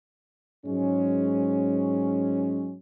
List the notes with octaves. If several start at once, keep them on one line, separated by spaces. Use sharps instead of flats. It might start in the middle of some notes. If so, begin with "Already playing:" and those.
G#2 F#3 G#3 C#4